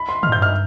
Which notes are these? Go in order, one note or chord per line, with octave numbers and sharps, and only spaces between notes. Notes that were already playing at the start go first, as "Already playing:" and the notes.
Already playing: B5
C6
D3 F6
A2
G6
G2
F6